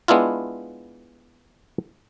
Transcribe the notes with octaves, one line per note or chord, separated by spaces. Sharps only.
G#3 B3 D4 E4 F4